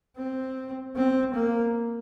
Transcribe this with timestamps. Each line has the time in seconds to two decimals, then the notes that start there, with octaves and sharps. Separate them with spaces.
0.17 C4
0.96 C4
1.34 A#3